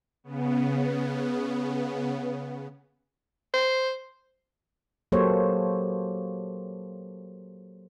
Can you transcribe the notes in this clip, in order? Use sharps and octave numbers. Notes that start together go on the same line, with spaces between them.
C#3 B3
C5
F#3 A#3 G4 A4 C5 C#5